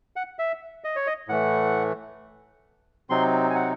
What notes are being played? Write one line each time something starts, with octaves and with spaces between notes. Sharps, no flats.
F#5
E5
D#5
C#5
D#5
A2 E3 A3 F#5
C3 F#3 C4 D#4 C6
G#5
F#5